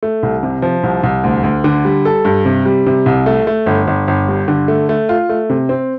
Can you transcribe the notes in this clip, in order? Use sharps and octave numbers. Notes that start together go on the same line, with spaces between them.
A3
C2
C3
F3
C2
C2
D2
D2
D3
G3
A4
G2
C3
G3
C3
C2
A3
A3
G1
G1
G1
G2
D3
A3
A3
F4
A3
C3
C4